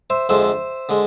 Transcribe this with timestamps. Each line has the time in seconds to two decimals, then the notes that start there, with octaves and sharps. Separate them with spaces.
0.10 C5 E5
0.29 F2 D3 G#3 C5 E5
0.89 D3 G#3